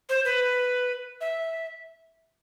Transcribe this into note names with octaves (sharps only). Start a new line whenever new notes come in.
C5
B4
E5